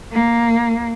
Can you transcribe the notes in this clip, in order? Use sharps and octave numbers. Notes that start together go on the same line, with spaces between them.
A#3